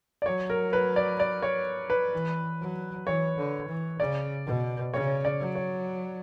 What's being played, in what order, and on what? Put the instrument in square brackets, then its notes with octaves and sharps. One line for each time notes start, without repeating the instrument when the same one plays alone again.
[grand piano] D5
[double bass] F#3 [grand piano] C#5
[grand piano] A#4
B4
D5
D5
C#5
B4
[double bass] E3
F#3
[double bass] E3 [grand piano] C#5
[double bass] D3
E3
[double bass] C#3 [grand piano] D5
[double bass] B2
[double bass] C#3 [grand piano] C#5
[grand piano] D5
[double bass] F#3
[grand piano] C#5